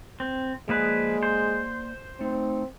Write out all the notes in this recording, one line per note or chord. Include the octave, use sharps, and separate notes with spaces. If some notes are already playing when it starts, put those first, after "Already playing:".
C4
F3 G#3 A#3 G#4 B4 D5
C5
A3 C4 D#4